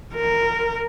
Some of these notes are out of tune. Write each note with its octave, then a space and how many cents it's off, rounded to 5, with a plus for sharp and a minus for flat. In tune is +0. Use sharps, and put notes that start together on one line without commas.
A#4 -10